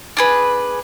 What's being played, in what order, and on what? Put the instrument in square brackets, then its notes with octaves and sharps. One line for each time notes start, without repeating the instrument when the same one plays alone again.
[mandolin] D4 G#4 B4